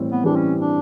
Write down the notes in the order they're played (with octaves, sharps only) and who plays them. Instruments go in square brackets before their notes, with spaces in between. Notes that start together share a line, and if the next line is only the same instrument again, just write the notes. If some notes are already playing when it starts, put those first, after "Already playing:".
Already playing: [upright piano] A2 E3 G3 C4
[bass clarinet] B3
[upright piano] E3 G3 C4 [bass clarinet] D4
[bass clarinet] C#4
D4